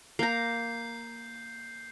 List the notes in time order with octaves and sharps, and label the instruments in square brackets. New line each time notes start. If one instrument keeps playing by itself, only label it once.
[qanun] A#3 A#5 [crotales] G6 C7